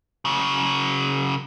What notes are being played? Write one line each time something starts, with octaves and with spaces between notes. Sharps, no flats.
C#3 F#3